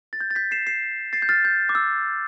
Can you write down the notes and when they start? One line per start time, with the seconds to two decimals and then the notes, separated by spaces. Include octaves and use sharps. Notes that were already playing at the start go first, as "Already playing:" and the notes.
0.13 A6
0.21 G6
0.31 A6
0.35 G6 B6
0.51 C7 E7
0.67 C7 E7
1.13 A6 C7
1.22 G6
1.29 F6 A6
1.45 G6
1.69 D6
1.75 E6